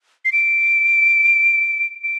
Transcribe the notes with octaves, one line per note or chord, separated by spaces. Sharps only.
C7
D7
D7